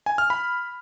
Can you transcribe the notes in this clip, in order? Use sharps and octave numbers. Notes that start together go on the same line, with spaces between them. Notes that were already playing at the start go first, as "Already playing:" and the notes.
G#5
F6
B5